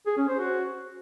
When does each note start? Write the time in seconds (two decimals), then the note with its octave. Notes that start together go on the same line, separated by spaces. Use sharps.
0.06 G#4
0.17 C#4
0.28 C5
0.39 F#4